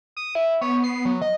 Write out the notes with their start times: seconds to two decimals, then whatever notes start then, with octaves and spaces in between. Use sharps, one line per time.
0.17 D#6
0.35 E4
0.61 B3 C#5
0.84 C7
1.05 F#3
1.22 D#5